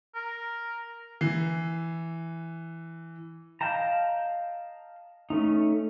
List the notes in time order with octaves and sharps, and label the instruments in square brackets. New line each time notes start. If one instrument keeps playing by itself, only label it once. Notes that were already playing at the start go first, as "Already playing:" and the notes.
[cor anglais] A#4
[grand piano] E3 C7
[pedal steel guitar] D#5 F5 G5 A5 A#5
A3 C#4 D#4